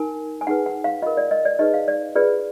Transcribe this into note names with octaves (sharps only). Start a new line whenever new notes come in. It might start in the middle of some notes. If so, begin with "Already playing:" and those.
Already playing: D#4 A#4 G#5
G#5
D#4 G#4 B4 F#5
F#5
F5
F4 A#4 D#5
D5
D#5
D5
D#4 G#4 B4 D#5
F5
D5
F4 G#4 B4 D5